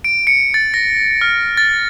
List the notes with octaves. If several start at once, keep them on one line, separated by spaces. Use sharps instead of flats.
D7
C#7
A6
A#6
F6
A6